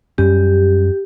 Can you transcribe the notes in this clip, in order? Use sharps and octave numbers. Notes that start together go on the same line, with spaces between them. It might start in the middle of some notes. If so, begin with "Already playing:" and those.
F#2 G3 C#4 G4